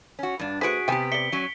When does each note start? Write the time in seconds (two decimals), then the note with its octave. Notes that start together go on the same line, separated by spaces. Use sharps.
0.19 C#4 F#4
0.39 G2 D4
0.61 A3 F#4 G#4 B4 C5 B6 D7
0.88 C3 B3 G4 G5 G#5
1.12 D5 E5 B6 C#7 G7
1.32 F#3 C#4